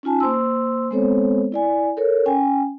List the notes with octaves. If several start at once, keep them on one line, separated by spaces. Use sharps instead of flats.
C#4 D#4 F4 G#5 A5
A#3 C5 C6 E6
G#3 B3 C4 A4 C5 C#5
E4 D5 G#5
A4 A#4 C#5
C#4 G5 G#5